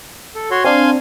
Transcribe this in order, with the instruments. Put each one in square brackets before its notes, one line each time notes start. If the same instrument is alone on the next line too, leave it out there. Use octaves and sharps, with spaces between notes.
[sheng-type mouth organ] A4
F#4 C#5 C6
[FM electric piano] C4 D4 [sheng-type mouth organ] F5 G#5 C6